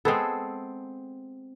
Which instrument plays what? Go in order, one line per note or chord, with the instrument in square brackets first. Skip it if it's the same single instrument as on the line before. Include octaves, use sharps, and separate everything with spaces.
[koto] G#3 B3 [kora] C4 G#4 A4